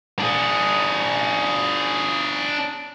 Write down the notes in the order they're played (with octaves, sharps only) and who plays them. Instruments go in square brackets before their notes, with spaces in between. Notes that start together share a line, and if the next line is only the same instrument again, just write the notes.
[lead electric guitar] D4 G#4